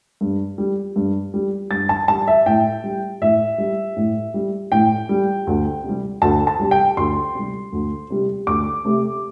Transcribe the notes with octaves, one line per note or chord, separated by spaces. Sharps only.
G2
G3
G2
G3
G2 A6
A5
G3 A5
E5
A2 G5
G3
A2 E5
G3
A2
G3
A2 G5
G3
D2
C3
G3
D2 A5
A5
C3 G3
G5
D2 C6
C3 G3
D2
C3 G3
D2 D6
C3 A3